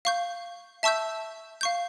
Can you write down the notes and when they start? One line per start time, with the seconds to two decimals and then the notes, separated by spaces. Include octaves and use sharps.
0.05 F5 C#6 G6
0.83 E5 A5 C#6 E6 G6
1.61 F5 C#6 G6